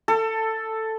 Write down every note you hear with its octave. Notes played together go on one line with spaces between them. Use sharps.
A4